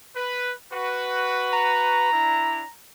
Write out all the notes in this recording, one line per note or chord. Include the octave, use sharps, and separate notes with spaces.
B4
F#4 B4
A#5
D4 E4